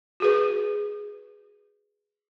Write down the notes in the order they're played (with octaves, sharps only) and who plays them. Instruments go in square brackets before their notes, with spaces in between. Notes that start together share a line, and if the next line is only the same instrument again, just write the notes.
[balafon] F#4 G#4 B4